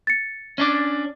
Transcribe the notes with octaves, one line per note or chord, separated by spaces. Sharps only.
A6 C#7
C#4 D4 D5